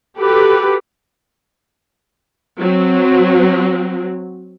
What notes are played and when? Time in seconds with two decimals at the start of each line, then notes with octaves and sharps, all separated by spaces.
0.19 F#4 G4 A4 B4
2.58 F#3 C4